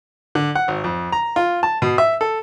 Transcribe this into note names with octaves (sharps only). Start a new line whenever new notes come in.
D3
F#5
G#1
F2
A#5
F4
A5
B2
E5
A4